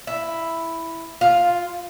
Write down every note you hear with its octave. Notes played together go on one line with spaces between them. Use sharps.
E4
F4